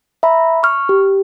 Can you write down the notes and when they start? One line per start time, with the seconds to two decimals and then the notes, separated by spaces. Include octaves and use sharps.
0.23 E5 A#5 B5
0.63 C#6 F6
0.89 G4